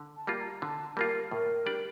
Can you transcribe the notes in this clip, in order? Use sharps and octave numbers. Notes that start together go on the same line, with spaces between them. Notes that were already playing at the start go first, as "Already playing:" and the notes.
Already playing: D3
A5
G3 A#3 F4
A#5
D3 A5
G3 A#3 F4 A#4
A2 A#4
G3 D4 G4 D5